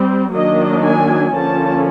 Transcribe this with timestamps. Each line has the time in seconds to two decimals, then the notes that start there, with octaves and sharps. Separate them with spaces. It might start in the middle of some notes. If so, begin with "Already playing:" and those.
Already playing: G3 C4
0.34 D#3 F#3 A#3 D4 D#5
0.84 G#5
1.33 D3 F3 A#3 C#4 A5